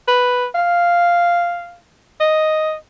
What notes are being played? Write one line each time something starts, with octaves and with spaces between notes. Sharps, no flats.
B4
F5
D#5